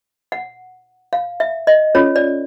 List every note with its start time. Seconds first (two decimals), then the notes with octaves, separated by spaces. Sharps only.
0.32 F#5
1.13 F5
1.40 E5
1.67 D#5
1.95 C#4 F4 A4 C#5
2.16 D5